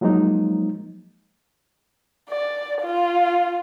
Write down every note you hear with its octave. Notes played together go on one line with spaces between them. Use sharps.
F3 F#3 G#3 A#3 D#4
D5
F4